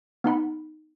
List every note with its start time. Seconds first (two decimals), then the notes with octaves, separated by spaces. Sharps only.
0.24 B3 D#4 F#5 B5